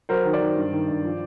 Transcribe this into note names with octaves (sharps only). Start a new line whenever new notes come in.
F#3 A#4 C5
D#3
C5 D5
D#3
G2
D#3
G2
F3